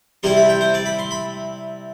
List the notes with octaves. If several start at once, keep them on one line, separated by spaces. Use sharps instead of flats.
C3 G3 C4 E4 C6
B5
G5
C5
D5
B5
C6
B5